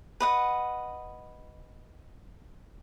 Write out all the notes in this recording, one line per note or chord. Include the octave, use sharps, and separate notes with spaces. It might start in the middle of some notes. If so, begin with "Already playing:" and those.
B4 D#5 F#5